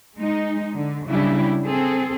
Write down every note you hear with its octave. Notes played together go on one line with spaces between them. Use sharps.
G#3 D#4
D3
C#3 F#3 G3 D4 E4 G4
C4 G#4 A4